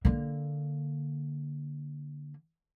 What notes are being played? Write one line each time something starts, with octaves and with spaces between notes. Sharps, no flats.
D3 A#3